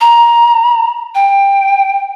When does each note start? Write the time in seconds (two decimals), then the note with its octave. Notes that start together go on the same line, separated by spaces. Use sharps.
0.01 A#5
1.15 G5